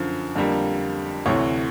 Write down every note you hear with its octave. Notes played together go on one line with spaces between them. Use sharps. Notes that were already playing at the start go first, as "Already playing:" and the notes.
Already playing: F#2 D3 F3
F2 D3 G3 A#3
D2 C3 E3 C#5